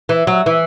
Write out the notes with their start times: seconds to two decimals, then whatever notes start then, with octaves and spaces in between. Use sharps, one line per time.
0.09 E3
0.27 F#3
0.46 E3